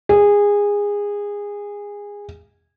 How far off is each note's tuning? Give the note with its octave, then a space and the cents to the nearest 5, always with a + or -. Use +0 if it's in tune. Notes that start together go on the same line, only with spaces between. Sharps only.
G#4 -20